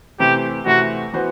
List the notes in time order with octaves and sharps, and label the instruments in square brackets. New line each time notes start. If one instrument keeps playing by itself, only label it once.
[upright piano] C3 E3 A3 C4 [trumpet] G4
[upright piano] C3 E3 A3 C4 [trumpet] F#4
[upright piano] E3 B3 F#4 C5